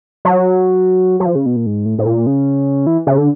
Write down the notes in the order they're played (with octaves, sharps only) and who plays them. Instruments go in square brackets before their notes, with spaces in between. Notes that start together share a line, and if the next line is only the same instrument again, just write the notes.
[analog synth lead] F#3
F#3
F3
C#3
B2
A#2
G#2
A2
A2
A#2
C#3
E3
C#3
D3